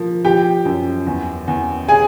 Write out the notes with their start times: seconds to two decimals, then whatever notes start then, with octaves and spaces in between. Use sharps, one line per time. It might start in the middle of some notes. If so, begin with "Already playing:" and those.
Already playing: F3 A#3
0.24 F3 G4 G5
0.65 F#2
1.07 E2
1.48 E2
1.89 G#4 G#5